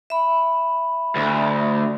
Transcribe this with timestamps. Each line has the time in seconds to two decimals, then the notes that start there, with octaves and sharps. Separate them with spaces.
0.10 E5 B5
1.16 D2